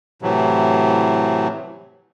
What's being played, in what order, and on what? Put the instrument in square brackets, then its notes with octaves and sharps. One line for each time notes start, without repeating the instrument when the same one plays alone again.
[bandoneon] A2 C3 E3 F#3